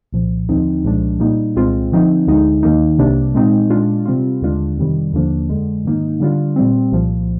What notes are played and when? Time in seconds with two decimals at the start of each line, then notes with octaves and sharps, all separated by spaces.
0.12 C2 A#2 F3
0.49 D#2 D3 F3 C4 D#4
0.84 C2 A#2 F3 G#3 D4
1.20 A#2 G3 A#3 D#4
1.56 C2 A#2 G#3 C4 F4
1.92 D3 F3 C4 D#4
2.27 D2 D3 G#3 D#4
2.63 D#2 D#3 A#3 D#4
2.98 C2 C3 G3 A#3 D4
3.34 A#2 G#3 C4 D#4
3.70 A#2 G#3 D4 F4
4.06 C3 G3 C4 F4
4.41 D#2 D3 G#3 D4 F4
4.78 F2 C3 D#3 G3
5.13 D#2 D3 F3 A#3 D4
5.49 F2 D3 G#3
5.85 G#2 D#3 A#3 D#4
6.20 D3 G3 D4 F4
6.56 A#2 G3 C4
6.92 C2 A#2 F3